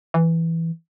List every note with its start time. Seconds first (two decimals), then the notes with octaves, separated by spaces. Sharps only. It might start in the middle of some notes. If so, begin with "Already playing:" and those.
0.14 E3